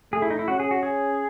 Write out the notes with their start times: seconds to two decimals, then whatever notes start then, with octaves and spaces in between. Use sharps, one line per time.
0.13 A3 G#4
0.22 E4
0.30 D#4
0.39 E4
0.48 C#4 F#4
0.60 G#4
0.71 F#4
0.83 G#4